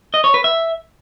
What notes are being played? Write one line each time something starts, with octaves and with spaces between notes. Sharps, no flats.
D#5
C#5
B4
E5